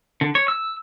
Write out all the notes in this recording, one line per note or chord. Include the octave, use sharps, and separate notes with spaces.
D3
C#5
E6